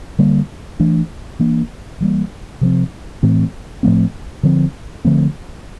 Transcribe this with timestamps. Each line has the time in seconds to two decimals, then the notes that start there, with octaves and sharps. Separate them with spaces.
0.19 D3 G3 A#3
0.80 E3 A3 D4
1.39 E3 A#3 D4
2.01 E3 G3 A#3
2.61 C3 F3 C4
3.23 A2 E3 A3 C4
3.83 A2 F3 A3 C4
4.43 D3 F3 C4
5.05 D3 F3 A3 C4